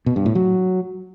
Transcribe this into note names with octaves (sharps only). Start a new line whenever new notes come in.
B2
G2
A2
F#3